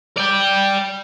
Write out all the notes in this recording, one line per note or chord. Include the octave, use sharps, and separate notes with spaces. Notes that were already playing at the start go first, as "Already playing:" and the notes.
D5 G5